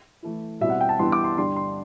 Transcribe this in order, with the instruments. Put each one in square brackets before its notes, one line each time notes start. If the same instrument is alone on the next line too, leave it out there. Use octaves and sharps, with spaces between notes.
[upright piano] E3 A3 E4
[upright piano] B2 G3 C4 E4 [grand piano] E5
[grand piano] F#5
G5
A5
[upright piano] G2 E3 B3 E4 G4 [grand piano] C6
[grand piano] D6
C6
[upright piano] G2 D3 G3 [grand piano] C6
[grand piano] C6